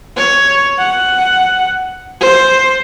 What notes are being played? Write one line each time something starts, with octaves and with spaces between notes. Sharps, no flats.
C#5
F#5
C5